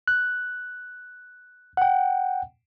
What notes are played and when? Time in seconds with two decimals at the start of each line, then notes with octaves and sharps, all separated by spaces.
0.08 F#6
1.77 F#5 G5